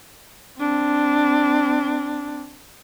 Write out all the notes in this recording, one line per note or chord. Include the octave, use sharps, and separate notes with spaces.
C4 D4